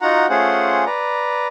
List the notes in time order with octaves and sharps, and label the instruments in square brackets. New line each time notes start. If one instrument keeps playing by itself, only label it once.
[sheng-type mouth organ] D#4 F4 F#4 F#5 A#5
A3 C#4 F4 G#4 C5 F#5
B4 D5 A#5